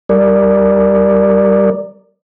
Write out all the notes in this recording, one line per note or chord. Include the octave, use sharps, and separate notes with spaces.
G3 A#4 D5